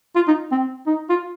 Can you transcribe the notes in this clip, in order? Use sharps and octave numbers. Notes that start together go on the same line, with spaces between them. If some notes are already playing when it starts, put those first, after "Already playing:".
F4
D#4
C4
D#4
F4